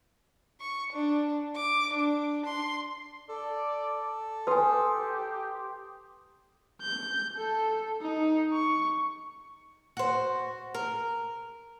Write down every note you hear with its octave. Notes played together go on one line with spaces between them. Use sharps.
C#6
D4
D6
D4
C6
A4 D5
G4 B4 G#5 C6 D#6
G6
A4
D#4
C#6
F#4 C5
A#4